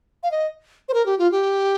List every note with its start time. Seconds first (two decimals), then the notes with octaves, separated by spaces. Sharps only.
0.23 F5
0.31 D#5
0.89 C5
0.94 A#4
1.06 G4
1.19 F4
1.32 G4